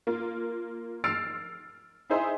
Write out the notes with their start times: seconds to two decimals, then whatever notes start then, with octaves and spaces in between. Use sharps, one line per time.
0.07 A#3 F4
1.04 E6 F6 A6 C7 D7
2.10 D#4 E4 G#4 C5 D#5 E5